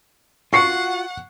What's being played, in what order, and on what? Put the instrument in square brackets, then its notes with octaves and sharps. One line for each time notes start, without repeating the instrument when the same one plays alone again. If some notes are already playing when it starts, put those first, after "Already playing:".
[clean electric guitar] F4 F#4 [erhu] F#5 [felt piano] C#6 C7 C#7